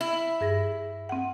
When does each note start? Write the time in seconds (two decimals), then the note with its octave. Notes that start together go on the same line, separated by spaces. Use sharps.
0.01 E4
0.41 G2 G#4 A#6
1.09 C4 F#5